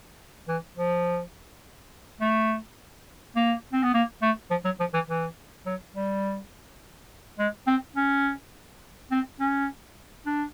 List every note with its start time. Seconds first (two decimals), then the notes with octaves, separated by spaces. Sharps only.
0.48 E3
0.77 F3
2.21 A3
3.36 A#3
3.73 C4
3.83 B3
3.94 A#3
4.22 A3
4.51 F3
4.65 F#3
4.80 F3
4.94 E3
5.08 E3
5.66 F#3
5.94 G3
7.39 G#3
7.67 C4
7.96 C#4
9.11 C4
9.40 C#4
10.26 D4